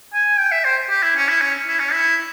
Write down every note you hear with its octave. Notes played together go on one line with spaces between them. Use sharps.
G#5
G5
E5
C5
G4
E4
C#4
E4
C#4
E4
C#4
E4